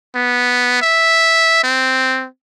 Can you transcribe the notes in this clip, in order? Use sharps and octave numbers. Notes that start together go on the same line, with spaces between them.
B3
E5
C4